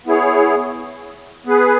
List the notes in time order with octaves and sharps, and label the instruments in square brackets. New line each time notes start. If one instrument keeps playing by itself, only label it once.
[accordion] B3 E4 G#4 C#5
B3 G#4 B4